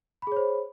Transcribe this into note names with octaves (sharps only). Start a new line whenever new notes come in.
G#4 C5 C#5 B5